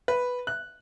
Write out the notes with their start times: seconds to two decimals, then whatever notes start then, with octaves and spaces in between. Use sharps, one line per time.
0.08 B4
0.47 F#6